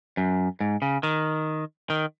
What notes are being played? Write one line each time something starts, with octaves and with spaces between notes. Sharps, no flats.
F#2
G#2
C#3
D#3
D#3